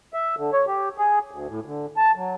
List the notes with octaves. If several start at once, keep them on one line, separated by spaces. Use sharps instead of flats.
E5
D3
C#5
G4
G#4
D2
A2
D3
A5
F#3